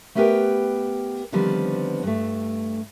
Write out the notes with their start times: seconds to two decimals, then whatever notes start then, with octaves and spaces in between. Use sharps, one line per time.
0.15 A3 B3 G4 A#4 B4 G5
1.32 D3 D#3 F3 G3 B3 C4
2.03 G2 A3